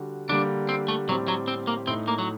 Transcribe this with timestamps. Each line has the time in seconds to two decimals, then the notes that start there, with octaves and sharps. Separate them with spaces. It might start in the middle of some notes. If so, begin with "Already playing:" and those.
Already playing: D3 G3 D4 F#4
0.29 D3 G3 A#3 D4
0.69 C4
0.88 A3
1.08 A2 F#3 G3 C4 G4
1.28 F#3
1.48 C4
1.67 A#3
1.87 A2 A3 C4 D#4
2.08 A#3
2.18 F#3